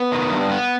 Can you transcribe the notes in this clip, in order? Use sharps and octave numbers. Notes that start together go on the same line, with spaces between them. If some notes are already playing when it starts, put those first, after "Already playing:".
Already playing: B3 B4
D#3
G2
B3